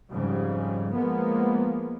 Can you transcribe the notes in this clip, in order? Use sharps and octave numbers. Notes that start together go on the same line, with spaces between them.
F2 G#2 C#3 G3
F3 G#3 A#3 B3